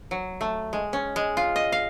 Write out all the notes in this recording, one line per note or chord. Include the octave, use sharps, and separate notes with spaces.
F#3
A3
G#3
C#4
G#3
F4
D#5
F5